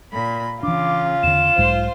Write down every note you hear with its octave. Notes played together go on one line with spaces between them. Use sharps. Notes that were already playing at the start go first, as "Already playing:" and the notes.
A#2 B5
C#3 E3 D4 F4 D6
E2 D3 E7
B1 G#2 G#3 C5